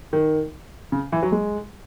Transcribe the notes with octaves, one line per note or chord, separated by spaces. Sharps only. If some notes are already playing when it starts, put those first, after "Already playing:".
D#3
C#3
E3
F#3
G#3